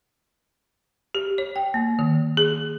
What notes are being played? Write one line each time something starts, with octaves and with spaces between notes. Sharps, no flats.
G4
C#5
G5
A#3
D#3
G#4